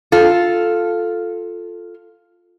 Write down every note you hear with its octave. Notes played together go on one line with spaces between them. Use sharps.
F4 A4